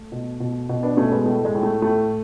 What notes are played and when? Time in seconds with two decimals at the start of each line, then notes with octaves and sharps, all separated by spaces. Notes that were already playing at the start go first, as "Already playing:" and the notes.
Already playing: A3
0.12 B2
0.40 B2
0.69 B2
0.83 B3 D4
0.97 B2 A3 C#4
1.12 G#3 B3
1.26 A2 A3
1.45 G#3
1.55 A2
1.63 A3
1.82 A2 A3